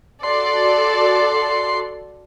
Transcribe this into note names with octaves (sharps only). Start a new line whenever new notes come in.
F#4 A4 D5 C6